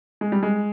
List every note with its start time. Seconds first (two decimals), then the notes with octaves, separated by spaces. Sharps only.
0.21 G#3
0.32 G3
0.43 G#3